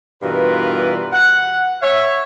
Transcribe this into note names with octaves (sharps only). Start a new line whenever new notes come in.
G2 B2 E3 F4 A#4 B4
F#5
C#5 E5